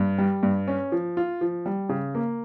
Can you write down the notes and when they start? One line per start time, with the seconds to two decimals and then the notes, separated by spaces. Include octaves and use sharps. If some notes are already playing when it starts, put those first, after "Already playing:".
Already playing: G2
0.18 G3
0.43 G2
0.67 C#4
0.92 F3
1.17 F4
1.41 F3
1.66 G3
1.89 C#3
2.15 A#3